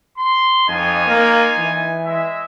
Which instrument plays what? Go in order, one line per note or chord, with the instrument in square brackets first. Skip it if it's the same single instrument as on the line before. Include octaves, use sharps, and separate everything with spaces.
[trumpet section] C6
[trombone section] F2 [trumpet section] D#4 F4 G#5
[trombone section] A#3
E3
[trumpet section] G#3 E5